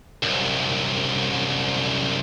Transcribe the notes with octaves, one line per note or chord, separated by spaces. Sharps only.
C2 F#2